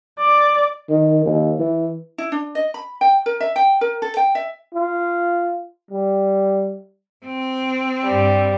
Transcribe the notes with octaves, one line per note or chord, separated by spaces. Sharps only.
D5
D#3
D#2
E3
E4
D4
D#5
B5
G5
A#4
E5
G5
A#4
A4
G5
E5
F4
G3
C4
G2 G3